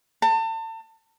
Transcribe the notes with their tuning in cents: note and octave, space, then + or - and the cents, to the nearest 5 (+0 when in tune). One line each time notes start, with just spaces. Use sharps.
A5 +35